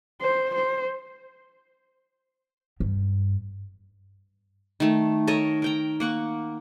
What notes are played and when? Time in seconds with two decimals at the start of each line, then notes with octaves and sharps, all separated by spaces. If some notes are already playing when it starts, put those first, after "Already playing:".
0.21 C5
0.55 C5
2.80 G2
4.80 D#3 A3
5.27 A4 A#4 C#5 D#5
5.62 A#4 G5 A#5
6.00 A#3 F#5 C#6